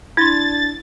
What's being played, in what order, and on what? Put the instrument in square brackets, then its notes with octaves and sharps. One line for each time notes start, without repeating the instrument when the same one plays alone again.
[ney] D4 [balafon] E4 C6 [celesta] G#6 [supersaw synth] A6